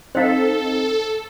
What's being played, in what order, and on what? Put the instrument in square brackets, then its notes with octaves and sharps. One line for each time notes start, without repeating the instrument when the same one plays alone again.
[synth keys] C4 D#4 [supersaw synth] A4 [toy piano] C5 F5